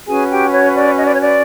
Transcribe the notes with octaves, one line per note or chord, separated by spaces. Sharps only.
C#4 F#4 G#4 B4 G#5
G4 G5
C#5
D5
D#5
D5
C#5
D5